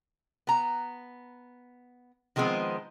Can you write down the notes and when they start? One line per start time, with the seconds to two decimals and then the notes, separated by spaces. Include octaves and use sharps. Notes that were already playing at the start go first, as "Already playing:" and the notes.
0.47 B3 A#5
2.36 D#3 F3 G#3 B3 C4